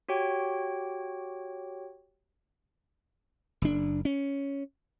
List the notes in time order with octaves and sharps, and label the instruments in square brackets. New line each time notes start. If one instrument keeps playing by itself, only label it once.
[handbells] F#4 G4 C#5 G5
[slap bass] F#1 D4
C#4